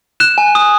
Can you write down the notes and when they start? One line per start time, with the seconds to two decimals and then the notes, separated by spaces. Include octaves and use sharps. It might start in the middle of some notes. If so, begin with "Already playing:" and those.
0.20 F#6 E7
0.38 G#5
0.55 D#6